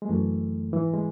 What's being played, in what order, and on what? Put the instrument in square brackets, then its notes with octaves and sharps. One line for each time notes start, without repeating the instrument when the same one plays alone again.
[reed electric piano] G#3
F#2 E3 A3
G#2 E3
G#3